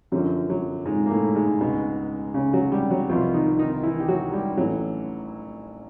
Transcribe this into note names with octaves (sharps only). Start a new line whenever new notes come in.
F#2 D3 F3 F#3
F#3
G#2 G#3
A#3
A2 A3
G#2 G#3
C#2 B2
C#3 C#4
F#3 F#4
G3 G4
F#3 F#4
C2 B2 F3 F4
D#3 D#4
D#3 D#4
E3 E4
G4
F#3 F#4
G3 G4
A1 A2 E3 F#3 F#4